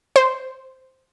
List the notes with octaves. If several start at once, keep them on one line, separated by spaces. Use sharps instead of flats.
C5